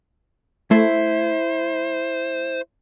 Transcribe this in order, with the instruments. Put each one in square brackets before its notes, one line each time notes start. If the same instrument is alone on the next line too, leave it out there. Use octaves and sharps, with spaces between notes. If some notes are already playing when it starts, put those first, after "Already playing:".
[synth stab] A3 [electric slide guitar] E4 [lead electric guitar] C5